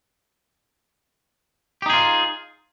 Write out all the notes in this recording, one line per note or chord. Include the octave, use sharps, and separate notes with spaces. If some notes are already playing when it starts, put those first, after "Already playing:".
D#4 F4 G4 G#4